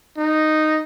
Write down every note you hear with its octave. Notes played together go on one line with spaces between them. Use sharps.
D#4